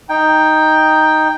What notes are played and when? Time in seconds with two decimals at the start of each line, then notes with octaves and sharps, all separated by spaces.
0.09 D#4 G5